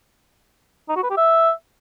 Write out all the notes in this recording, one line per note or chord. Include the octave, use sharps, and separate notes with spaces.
D#4
F#4
B4
G4
E5